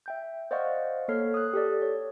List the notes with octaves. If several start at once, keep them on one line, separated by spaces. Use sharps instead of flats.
E5 G5 G6
C5 D5 D#5 F5 F#5 C#6
A#3 A4 C#5 F6 C7
D#6 F#6
G4 A4 D5
C#5